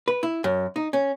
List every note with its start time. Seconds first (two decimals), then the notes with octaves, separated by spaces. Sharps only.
0.08 B4
0.23 E4
0.44 F#2
0.76 D#4
0.93 C#4